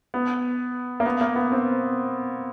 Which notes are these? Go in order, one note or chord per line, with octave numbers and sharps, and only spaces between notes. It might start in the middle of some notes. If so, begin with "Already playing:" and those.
B3
A#3
B3
A#3
B3
C4